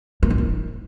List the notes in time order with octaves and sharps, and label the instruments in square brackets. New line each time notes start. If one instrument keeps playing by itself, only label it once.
[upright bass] A#3
D#4
E4